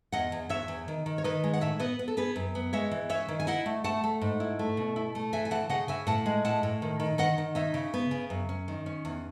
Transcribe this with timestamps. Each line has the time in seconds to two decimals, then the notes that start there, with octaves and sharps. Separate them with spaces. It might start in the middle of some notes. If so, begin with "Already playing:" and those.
0.12 E2 D#5 F#5
0.32 E2
0.49 E2 C#5 E5
0.68 E2
0.88 D#3
1.06 D#3
1.18 C#5
1.24 D#3 B4 D#5
1.44 G#3
1.53 F#5
1.61 A2 C#5 E5
1.80 B3 B4 D#5
1.99 B3
2.08 A4
2.17 B3 G#4 B4
2.36 F#2
2.55 B3
2.73 G#3 C#5 E5
2.91 E3
3.09 C#4 C#5 E5
3.28 D#3
3.40 G#5
3.47 E4 D#5 F#5
3.66 A3
3.84 A3 F#5 A5
4.04 A3
4.21 G#2
4.40 E4
4.59 A3
4.77 B2
4.96 E4
5.15 A3
5.33 E3 E5 G#5
5.45 G#5
5.51 E3 F#5 A5
5.69 C#3 D#5 F#5
5.88 C#3 E5 G#5
6.07 A2 F#5 A5
6.26 G#3
6.45 A2 F#5 A5
6.63 A2
6.82 D#3
7.00 D#3
7.18 D#3 D#5 F#5
7.38 D#3
7.55 D#4 C#5 E5
7.74 C#3
7.94 B3
8.11 C#3
8.30 F#2
8.49 C#4
8.68 D#3
8.86 C#4
9.05 E2